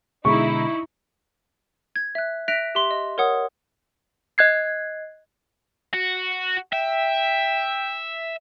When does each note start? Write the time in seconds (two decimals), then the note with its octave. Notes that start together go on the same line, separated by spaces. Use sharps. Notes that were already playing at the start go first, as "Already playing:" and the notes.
0.25 B2 D3 G#3 D#4 E4 C#6
1.96 G#6
2.15 E5 F#6
2.48 E5 F#6 A#6 B6 D7 F7
2.75 G4 E5 C6
2.91 D#5
3.18 A#4 C#5 F#5 D#6
4.38 D#5 F#6 G#6 C7
5.93 F#4
6.73 E5 G5